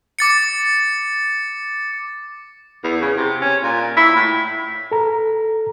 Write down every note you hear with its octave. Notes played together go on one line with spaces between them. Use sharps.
D6 A6 C#7
E2
C#3
C3
C#4
A#2
E4
A2
A4 A#5